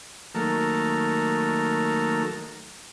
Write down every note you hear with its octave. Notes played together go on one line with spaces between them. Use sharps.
D#3 F#3 A3 A#3 A4 A#4